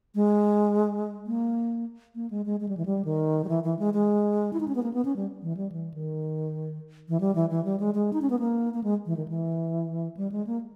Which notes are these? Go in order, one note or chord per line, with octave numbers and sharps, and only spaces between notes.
G#3
A#3
A#3
G#3
G#3
G#3
G3
E3
G3
D#3
G3
E3
E3
G#3
G#3
E4
D#4
C#4
B3
A#3
B3
C#4
G3
E3
G3
E3
D#3
E3
G3
E3
E3
G3
G#3
G#3
D#4
C#4
B3
A#3
A#3
G#3
E3
D#3
E3
G3
G#3
A#3